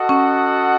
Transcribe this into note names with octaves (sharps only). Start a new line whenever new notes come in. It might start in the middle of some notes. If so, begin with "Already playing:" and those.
Already playing: F#4 A4 D#5 F#5
C#4